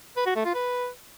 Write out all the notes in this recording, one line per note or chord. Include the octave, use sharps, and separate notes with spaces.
B4
F#4
A3
F4
B4